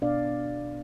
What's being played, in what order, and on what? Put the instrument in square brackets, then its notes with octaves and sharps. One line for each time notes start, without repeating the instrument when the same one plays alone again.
[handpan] B2 B3 D4 D5 F5